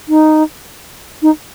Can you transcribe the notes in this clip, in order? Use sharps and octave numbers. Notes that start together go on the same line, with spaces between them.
D#4
D#4